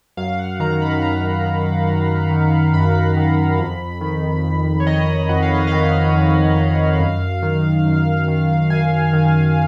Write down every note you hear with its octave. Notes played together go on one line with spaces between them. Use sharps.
F#2 F5
F#5
D#3 A#5
B5
F#2 A#5
D#3
F#2
D#3
F#2 B5
D#3
F2
D#3
F2
C#5
D#3 D#5
F2 F#5
F5
D#5
D#3 F5
F2
D#3
F#2
D#3
F#2
D#3
F#2 G#5
D#3